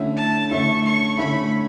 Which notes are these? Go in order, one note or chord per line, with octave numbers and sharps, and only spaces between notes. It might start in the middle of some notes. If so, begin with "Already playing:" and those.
Already playing: D3 A3 C#4 E4
A5
D3 A3 C#4 E4 C#6
C#6
D3 A3 C#4 E4 B5